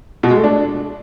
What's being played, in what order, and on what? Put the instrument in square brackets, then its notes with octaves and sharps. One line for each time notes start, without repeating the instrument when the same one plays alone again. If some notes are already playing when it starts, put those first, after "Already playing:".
[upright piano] B2
G#3
A3
D4